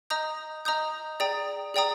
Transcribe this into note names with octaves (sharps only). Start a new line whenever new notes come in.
D#5 A#5 D#6 G6
D#5 A#5 D#6 G6
G#4 D5 G5 A#5 D#6
G#4 D5 G5 A#5 D#6